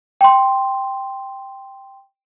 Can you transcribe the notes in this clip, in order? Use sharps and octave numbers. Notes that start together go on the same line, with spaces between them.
G5 C6